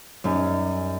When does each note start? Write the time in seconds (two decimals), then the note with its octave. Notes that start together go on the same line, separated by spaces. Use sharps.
0.24 F#2 G3 D#4